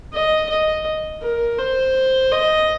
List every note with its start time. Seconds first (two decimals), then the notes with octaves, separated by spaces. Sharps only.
0.13 D#5
0.49 D#5
1.22 A#4
1.59 C5
2.31 D#5